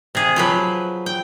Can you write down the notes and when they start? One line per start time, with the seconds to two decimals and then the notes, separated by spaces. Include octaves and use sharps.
0.15 C3 G#4
0.36 F3 F#3 B4
1.06 G5